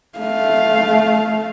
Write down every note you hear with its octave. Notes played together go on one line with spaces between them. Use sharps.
A3 F5